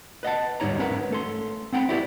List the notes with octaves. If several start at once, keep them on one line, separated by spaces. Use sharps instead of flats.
B4 D#5 F#5 A5
D2 G#2 G3 D#4 C#5 A#5
C#4 A#4 B4 F#5
A3 A4 C6
C4 F#5 G5 A#5 B5
E4 F#4 G4 B4 C5 D5